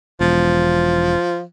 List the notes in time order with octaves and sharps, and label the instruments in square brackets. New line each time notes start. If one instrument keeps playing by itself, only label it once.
[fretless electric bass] E1 [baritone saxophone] F3